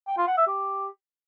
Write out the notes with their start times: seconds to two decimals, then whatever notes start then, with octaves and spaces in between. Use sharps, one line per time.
0.07 G5
0.17 F4
0.27 F#5
0.37 E5
0.47 G4